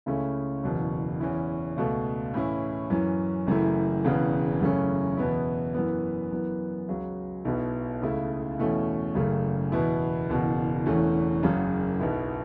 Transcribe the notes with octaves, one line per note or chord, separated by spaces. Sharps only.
C#2 C#3 A3 C#4 E4
F#1 E2 B2 F#3
E2 E3 C#4 E4
C#2 B2 A3
A2 E3 C#4 E4
F#2 E3 C#4
F#1 F#2 E3 A3 E4
E1 E2 C#3 E3 B3
F#2 C#3 A3 C#4 E4
E2 B2 B3 E4
F#2 E3 B3
F#2 E3 B3
C#2 C#3 F#3
B1 B2 B3 E4
C#2 C#3 A3 E4
E2 B2 A3 C#4 E4
F#1 F#2 C#3 A3
E2 B2 B3 E4
F#1 E2 B2
E1 E2 E3 A3 C#4
F#1 F#2 C#3
B1 B2 B3 E4